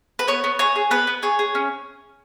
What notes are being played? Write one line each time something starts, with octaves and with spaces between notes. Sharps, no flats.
B4
B3 C#5
B3
G#4 C#5
G#4
B3 B4
B3
G#4 C#5
G#4
C#4